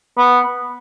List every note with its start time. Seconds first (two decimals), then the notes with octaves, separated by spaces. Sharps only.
0.17 B3